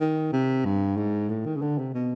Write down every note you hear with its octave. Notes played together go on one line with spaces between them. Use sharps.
D#3
C3
G2
G#2
A2
D#3
C#3
D3
C3
B2